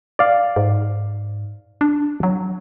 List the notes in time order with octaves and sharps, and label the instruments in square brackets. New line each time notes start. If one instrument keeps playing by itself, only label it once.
[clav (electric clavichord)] D5 F5
[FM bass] G#2
D4
F#3